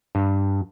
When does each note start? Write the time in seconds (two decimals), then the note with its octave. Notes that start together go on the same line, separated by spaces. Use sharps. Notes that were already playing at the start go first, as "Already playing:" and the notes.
0.15 G2